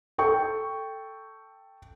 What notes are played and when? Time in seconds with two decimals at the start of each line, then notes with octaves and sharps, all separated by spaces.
0.18 A4 G5 C#6